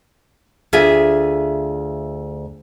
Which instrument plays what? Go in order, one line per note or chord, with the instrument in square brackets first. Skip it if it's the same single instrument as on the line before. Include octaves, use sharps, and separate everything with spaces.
[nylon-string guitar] D2 F4 G#4 E5